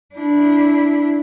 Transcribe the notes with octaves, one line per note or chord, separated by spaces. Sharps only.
D4 E4